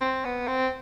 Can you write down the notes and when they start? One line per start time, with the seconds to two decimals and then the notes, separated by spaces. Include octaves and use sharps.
0.01 C4
0.25 B3
0.48 C4